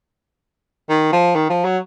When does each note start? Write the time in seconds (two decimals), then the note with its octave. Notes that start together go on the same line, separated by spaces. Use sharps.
0.90 D#3
1.12 F3
1.35 D#3
1.50 F3
1.64 F#3